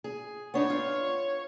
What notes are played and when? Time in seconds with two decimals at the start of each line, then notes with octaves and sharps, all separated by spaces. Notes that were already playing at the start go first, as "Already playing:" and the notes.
0.04 G#4
0.54 B3 D4 D#4 C#5
0.70 F4